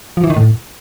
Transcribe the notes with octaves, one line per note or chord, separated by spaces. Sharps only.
F3
E3
D#3
A2